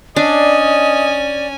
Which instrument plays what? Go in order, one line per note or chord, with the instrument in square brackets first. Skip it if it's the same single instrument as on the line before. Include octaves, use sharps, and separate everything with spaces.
[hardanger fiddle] C#4 G#5 [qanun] D4 [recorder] D5 [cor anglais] D#5